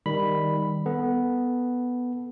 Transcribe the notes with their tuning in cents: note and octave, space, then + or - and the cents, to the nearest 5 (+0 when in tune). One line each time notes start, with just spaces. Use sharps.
D#3 +5 G3 +10 B5 +0
B3 +0 A4 +0